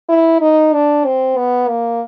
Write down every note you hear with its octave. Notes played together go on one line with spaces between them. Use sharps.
E4
D#4
D4
C4
B3
A#3